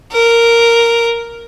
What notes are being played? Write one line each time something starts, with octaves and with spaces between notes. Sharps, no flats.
A#4